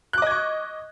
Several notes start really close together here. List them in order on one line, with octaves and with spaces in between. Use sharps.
F#6 D6 D#5 G#6 C#6